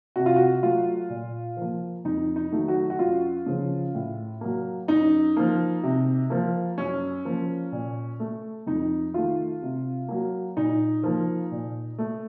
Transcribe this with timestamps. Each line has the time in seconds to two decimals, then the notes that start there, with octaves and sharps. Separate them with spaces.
0.16 C3 F#4
0.26 F4
0.36 F#4
0.62 F#3 A3 F4
1.10 A#2
1.57 F3 A#3
2.04 F2 D#4
2.36 D#4
2.52 D#3 F#3 A3
2.68 F#4
2.90 F#4
2.99 F#2 F4
3.46 C#3 F3
3.95 A2
4.41 F#3 A#3
4.88 F#2 D#4
5.37 F3 A#3
5.83 C3
6.30 F3 A#3
6.78 F#2 C#4
7.25 F3 A#3
7.72 A#2
8.20 A3
8.67 F2 D#4
9.14 D#3 A3 F4
9.62 C3
10.08 F#3 A#3
10.57 A#2 D#4
11.03 F3 A#3
11.51 A#2
11.98 A3